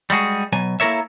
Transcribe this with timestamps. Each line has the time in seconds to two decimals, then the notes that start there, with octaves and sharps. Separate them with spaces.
0.10 G3 G#3 F#4 G#4
0.52 B2 F#3 G#5
0.80 A#3 E4 A4 A#4 C#5 E5